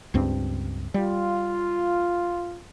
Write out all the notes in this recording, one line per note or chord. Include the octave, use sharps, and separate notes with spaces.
C#2 G2 C4
G3 F4